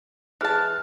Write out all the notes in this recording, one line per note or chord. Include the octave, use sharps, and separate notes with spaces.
E3 G#4 A5 F6 F#6